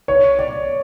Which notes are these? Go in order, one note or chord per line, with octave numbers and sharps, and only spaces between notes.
C#5
D5